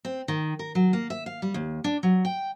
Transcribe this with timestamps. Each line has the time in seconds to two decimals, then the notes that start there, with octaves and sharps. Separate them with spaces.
0.05 C4
0.28 D#3
0.59 A#4
0.75 F#3
0.93 A#3
1.10 E5
1.26 F5
1.42 G3
1.54 D#2
1.84 D4
2.03 F#3
2.25 G5